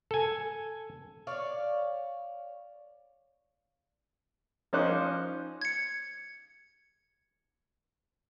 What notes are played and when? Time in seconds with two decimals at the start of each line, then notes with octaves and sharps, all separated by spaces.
0.11 A4 G#5
1.27 C#5 D5 F5
4.73 F3 C#4 D#4 C5 D6 F#6
5.61 G#6 C#7